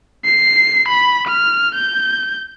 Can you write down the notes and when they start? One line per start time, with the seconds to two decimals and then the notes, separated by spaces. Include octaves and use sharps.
0.25 C7
0.89 B5
1.28 F6
1.75 G6